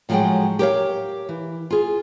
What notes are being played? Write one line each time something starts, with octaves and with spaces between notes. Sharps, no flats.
A2 F3 F#3 G#3 F#5 G5
G4 A#4 C#5 F5
E3
F4 G#4